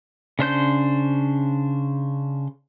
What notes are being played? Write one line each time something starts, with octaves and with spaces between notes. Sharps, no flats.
C#3 D4 C5 G6